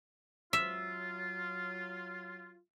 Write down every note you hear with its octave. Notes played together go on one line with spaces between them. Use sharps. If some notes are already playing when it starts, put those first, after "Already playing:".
F#3 F4 E5